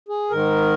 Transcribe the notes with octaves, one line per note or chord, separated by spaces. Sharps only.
G#4
G#2 D#3 A#4